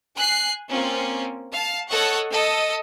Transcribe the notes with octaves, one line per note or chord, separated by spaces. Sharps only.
G#5 F#6 C7
A#3 C4 C#4 F4
F5 A5
A4 C#5 D#5 F#5 C#6
A4 D#5